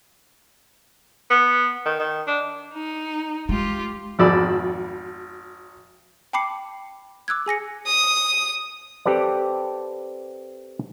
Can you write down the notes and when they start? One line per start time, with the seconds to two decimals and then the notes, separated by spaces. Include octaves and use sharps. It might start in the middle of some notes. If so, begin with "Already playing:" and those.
1.31 B3
1.86 D#3
2.00 D#3
2.27 D4
2.74 D#4
3.49 G#3 F4 G4
4.19 G#1 F2 B2 D5 B5 E6
6.33 G5 A5 B5 D6 C7 C#7
7.28 D6 E6 F#6 G#6
7.46 G#4 G#5 A#6 C#7
7.86 D#6
9.06 C4 G4 A4 B4 D5